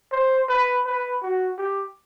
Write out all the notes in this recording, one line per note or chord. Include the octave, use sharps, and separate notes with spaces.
C5
B4
B4
F#4
G4